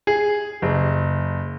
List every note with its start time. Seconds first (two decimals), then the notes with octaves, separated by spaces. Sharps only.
0.07 G#4
0.62 F#1